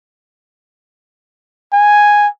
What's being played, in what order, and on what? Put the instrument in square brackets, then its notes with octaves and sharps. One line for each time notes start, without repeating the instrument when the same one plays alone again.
[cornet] G#5